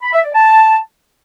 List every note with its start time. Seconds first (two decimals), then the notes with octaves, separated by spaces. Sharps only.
0.02 B5
0.13 E5
0.23 D5
0.34 A5